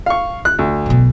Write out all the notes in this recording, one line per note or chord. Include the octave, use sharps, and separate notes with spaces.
F5 C#6
F#6
D2
B1 B2